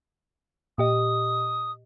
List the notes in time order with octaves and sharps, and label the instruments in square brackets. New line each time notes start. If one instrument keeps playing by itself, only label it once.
[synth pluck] A#2 G4 D#5 [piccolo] D#6